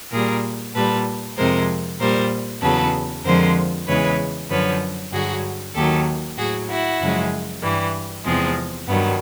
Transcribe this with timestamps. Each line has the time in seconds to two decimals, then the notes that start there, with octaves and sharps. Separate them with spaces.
0.11 A#2 G3 G#4 A#4
0.74 A#2 G3 A4 B4
1.37 F2 C3 F3 G#3 A#4 C5
2.00 A#2 G3 A#4 C5
2.61 E2 C#3 F#3 A4 B4
3.24 F2 D3 F3 G#3 A#4 C5
3.87 E2 C#3 E3 G#3 B4 C#5
4.49 F#2 D3 F3 B4 C#5
5.12 G2 D3 F#3 F#4 G#4
5.74 D#2 D#3 F#3 G4 A4
6.37 A2 F#3 F#4 G#4
6.69 E4 F#4
7.00 F#2 C#3 F3 G#3
7.62 G2 E3 G3
8.25 E2 C3 F3 G#3 C4
8.87 G2 D#3 F#3 B3